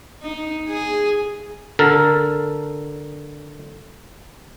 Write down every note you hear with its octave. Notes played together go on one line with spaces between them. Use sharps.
D#4
G#4
D3 A4 A#4